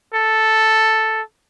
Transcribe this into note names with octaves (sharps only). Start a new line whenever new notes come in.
A4